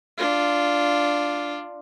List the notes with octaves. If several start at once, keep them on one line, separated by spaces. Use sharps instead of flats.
D4 F4